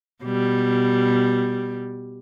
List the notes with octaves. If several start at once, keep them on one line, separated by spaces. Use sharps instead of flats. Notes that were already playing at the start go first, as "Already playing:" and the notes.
B2 G3